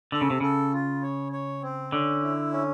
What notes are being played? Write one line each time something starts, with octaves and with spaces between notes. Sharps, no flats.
D3 A4
C#3
C3
C#3 A4
F4
C#5
C#5
C4
D3 C#4
E4
C#4